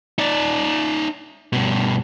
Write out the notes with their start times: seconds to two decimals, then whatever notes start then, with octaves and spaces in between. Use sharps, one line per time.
0.18 D#4 D5
1.53 G2 B2